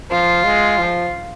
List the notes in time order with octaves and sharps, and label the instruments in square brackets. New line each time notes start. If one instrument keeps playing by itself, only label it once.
[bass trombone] F3 [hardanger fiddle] F4
[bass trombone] G#3
F3